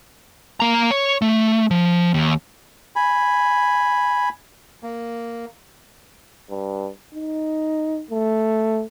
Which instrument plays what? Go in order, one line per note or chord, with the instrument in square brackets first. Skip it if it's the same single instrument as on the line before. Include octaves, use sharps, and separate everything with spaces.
[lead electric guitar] A#3 A#5
C#5
A3
F3
D#2
[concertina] G#5 B5
A#3
[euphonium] G2
D#4
A3